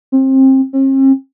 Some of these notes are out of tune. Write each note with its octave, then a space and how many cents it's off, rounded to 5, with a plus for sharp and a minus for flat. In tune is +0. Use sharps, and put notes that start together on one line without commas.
C4 +25
C4 +45